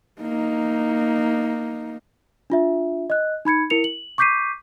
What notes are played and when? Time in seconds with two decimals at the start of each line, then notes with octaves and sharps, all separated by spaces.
0.22 A#3 D#4
2.50 D4 F4 E5
3.10 D#5 F#6
3.45 D#4 B5 G#6 C#7
3.70 E4 A#4 C#7 F7
3.84 F#7
4.18 C#6 D6 G6 B6 C7 D#7